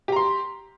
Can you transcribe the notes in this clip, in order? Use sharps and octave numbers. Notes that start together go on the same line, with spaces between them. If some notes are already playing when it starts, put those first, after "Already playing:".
G4 A#5 C6